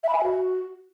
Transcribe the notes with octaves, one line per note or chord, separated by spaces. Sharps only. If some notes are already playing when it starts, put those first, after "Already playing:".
E5
B5
G#5
E5
F#4